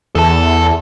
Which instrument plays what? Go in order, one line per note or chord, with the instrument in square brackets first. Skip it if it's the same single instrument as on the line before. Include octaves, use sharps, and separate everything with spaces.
[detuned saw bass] E2 [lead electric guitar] A4 A5